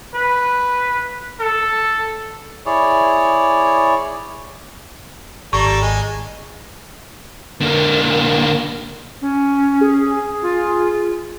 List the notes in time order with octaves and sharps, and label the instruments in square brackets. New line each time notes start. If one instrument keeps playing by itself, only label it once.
[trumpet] B4
A4
[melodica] E4 G#4 C#5 D5
[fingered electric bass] G#1 [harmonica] G3 A4 A#5 [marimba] C#6
[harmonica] G#3
[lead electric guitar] D3 A#3
[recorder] C#4
[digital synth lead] G#4
[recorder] F4